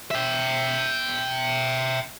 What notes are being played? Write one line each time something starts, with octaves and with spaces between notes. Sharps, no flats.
E5 G5